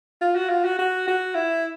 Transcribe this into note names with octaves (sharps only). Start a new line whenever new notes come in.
F4
F#4
F4
F#4
F#4
F#4
E4